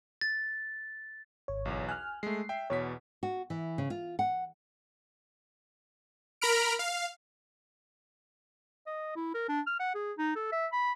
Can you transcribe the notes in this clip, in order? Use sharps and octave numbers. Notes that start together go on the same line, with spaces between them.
A6
G#1 C#5
B1 E2
G#5 F6 F#6
G#3 A3 C7
E5 G5
E2 B2 C#5 B6
F#4
E3
C#3
F4
F#5
A#4 A#5 B5 F6 D7
F5
D#5
E4
A#4
D4
F6
F#5
G#4
D#4
A4
E5
B5